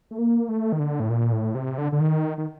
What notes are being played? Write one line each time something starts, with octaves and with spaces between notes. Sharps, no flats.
A3
A#3
A3
D#3
D3
A2
A#2
A2
C3
D3
D3
D#3
D#3